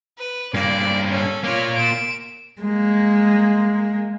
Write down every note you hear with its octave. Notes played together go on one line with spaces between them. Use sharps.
B4
G2 A#3 D5
C#4 A4
A#3 F4 C#5 D5
D7 E7
G#3 A#3